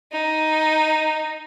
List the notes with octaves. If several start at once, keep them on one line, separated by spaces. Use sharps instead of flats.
D#4